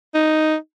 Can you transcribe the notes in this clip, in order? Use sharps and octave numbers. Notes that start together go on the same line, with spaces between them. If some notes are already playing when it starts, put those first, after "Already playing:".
D#4